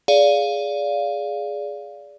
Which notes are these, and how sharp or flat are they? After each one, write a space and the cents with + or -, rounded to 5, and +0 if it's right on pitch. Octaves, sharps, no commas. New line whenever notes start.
G#4 +0 D5 -20 F5 +0